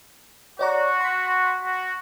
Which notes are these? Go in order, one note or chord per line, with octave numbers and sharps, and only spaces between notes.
F#4 C#5 D5 A#5
C6 B6
F#4